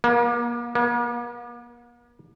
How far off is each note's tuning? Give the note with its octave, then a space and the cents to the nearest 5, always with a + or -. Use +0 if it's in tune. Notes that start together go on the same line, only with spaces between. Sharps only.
A#3 +35
A#3 +45